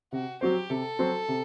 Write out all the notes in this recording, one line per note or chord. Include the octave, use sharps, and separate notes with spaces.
C3 F#4
F#3 C4 F#4 G4 C5
C3 A4
F#3 C4 F#4 C5
C3